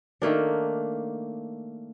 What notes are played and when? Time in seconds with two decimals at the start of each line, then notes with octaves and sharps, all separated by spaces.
0.22 D#3 A3 A#3 D4